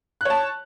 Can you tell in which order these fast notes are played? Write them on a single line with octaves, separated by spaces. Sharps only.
F#6 C#5 A5